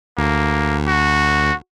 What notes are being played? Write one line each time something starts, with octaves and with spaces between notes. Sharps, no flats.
D2 A#3
F#4